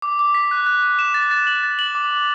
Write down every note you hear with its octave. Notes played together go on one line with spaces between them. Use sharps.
D6
D6
B6
F#6
F#6
F#6
E7
A6
A6
F#7
A6
F#7
D6
D6